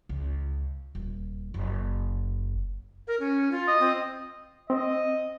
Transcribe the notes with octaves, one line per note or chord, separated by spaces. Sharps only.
C#2
D#1
F#1
A#4
C#4
F4
D#5
C4
C4 D#5